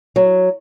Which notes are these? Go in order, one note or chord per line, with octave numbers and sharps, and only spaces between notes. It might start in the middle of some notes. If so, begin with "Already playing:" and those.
F#3